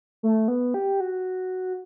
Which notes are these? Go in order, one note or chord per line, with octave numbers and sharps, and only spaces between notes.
A3
B3
G4
F#4